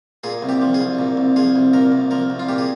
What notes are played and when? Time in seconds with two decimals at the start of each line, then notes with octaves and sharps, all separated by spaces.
0.24 A#2 G#4
0.42 C2
0.49 G4
0.61 F3
0.74 G#4
0.80 C2
0.99 A#2
1.17 C2
1.36 F3 G#4
1.55 C2
1.73 A#2 A#4
1.92 C2
2.11 F3 A#4
2.30 C2
2.39 F4
2.48 A#2 G4
2.58 G#4